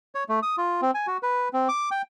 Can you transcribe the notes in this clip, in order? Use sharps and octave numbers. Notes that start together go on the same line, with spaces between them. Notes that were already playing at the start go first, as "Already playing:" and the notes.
C#5
A3
D#6
F4
C4
G#5
F#4
B4
C4
D6
G5